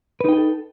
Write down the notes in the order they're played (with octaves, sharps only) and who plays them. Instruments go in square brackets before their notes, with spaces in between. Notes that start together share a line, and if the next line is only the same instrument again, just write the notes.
[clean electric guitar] B4
D#4
G5
G#4
A4